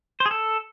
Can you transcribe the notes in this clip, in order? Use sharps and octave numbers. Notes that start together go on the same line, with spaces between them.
C5
G#4
A4